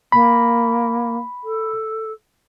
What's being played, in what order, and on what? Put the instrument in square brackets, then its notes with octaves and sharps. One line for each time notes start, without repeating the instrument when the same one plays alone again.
[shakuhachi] A#3 [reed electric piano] B5
[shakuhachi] A4